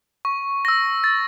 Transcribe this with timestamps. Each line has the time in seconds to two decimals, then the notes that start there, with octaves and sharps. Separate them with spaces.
0.25 C#6
0.65 E6 A#6
1.04 A6